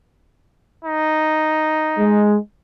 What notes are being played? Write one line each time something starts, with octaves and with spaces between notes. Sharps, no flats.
D#4
G#3